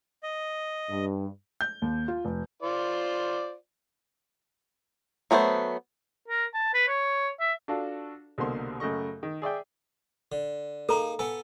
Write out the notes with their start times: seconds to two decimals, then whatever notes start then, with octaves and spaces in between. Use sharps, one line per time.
0.23 D#5
0.89 G2
1.61 G6
1.82 D#2
2.08 F4
2.25 F1
2.62 F4 C5 D5
5.31 F#3 A3 B3 F#4 C5
6.28 A#4
6.54 A5
6.74 B4
6.88 C#5
7.40 E5
7.68 D4 F4 F#4 A4 F5 A5
8.38 C2 B2 D3 A#3 C5 C6
8.80 F#2 C#3 A3 D#5 C#6
9.23 D#3
9.42 G#4 D5 E5 G5
10.32 D3
10.89 A#3 D#4 G#4 A4 F5 A#5
11.19 B3 A4 G#5